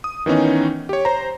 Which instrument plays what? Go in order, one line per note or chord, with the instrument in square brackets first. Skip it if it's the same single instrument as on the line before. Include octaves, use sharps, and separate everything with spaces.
[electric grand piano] D#6
D#3 E3 B3 C#4 D#4
G4 C#5
C5 A#5